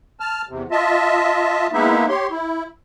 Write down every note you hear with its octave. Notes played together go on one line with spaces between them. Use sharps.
A5 F6
E2 C3
F4 D#5 E5 A5
G#3 A#3 B3 D#4 E4 E5
G4 C#5 C6
E4